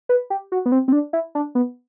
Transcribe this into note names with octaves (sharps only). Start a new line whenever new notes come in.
B4
G4
F#4
B3
C4
C4
D4
E4
D4
B3